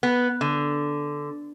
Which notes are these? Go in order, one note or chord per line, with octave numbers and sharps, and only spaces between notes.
B3
D3